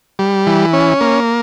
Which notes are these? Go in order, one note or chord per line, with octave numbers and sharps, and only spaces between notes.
G3
E3
C#4
A#3